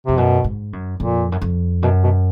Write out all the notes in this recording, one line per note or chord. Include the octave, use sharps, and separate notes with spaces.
F2 C3
F#2 B2
G#2
F#2
F2 A#2
F#2
F2
F#2 B2
B2